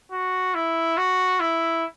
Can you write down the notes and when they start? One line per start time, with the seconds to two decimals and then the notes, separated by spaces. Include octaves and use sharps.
0.12 F#4
0.55 E4
0.97 F#4
1.40 E4